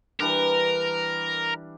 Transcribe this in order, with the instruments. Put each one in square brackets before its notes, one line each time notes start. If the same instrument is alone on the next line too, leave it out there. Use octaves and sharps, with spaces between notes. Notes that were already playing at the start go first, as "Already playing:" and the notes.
[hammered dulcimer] E3 G3 D4 [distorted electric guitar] A#4